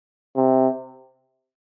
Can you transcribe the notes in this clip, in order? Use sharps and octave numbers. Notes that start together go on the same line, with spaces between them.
C3